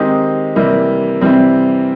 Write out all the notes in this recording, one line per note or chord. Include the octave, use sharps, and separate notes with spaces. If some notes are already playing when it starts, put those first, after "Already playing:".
Already playing: D#3 G#3 C4 D#4 G4
C3 E3 G3 A#3
C3 E3 G3 C4